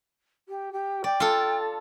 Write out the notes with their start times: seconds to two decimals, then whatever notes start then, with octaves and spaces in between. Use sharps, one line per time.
0.48 G4
0.72 G4
1.04 D5 G5
1.20 F4 A4